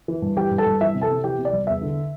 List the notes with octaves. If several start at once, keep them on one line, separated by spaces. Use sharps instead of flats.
E3
G2
E3 G4 G5
G2
A4 A5
G2
E3 E5
C3
A4 A5
C3
E3 G4 G5
C3
D5
C2
E2 E5
D3